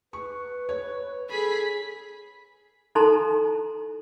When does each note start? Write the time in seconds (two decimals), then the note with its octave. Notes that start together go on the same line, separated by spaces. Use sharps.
0.13 B4 C#6
0.69 C#5
1.30 G#4 A4 B5 B6
2.95 D#4 E4 A4 A5 A#5 C6